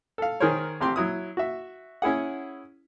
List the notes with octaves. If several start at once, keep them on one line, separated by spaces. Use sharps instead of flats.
A4 F5
D#3 G#4 A#4 C5 C#5
A1 C4 G4 C6
F#3 E4 D#6
F#4 E5
C#4 E4 G#4 F#5